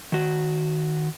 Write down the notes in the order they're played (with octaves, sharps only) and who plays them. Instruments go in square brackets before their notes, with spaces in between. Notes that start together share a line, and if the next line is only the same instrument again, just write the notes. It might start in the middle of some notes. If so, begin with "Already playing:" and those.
[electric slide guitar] D#3 F#4